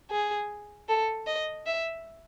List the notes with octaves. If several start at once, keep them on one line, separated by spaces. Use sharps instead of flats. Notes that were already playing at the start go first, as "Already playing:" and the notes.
G#4
A4
D#5
E5